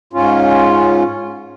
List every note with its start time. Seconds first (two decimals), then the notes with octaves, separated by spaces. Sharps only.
0.13 G#2 C#4 F4